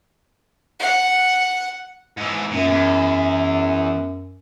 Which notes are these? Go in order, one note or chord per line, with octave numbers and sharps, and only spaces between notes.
F#5
G#2 E3
F#2 A#2
E2